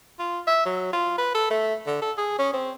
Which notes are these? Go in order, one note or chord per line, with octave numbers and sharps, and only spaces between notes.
F4
E5
F#3
F4
B4
A4
A3
D3
A4
G#4
C#4
C4